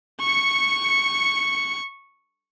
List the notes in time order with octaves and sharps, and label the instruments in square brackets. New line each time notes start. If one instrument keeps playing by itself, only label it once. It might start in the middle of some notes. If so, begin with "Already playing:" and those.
[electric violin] C#6 C#7